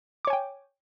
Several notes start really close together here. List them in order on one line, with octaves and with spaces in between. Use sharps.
D6 C#5 G#5 G5